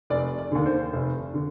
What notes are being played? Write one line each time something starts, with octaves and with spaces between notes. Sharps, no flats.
F1 D5
D5
D#2 D3
C5
F1
D3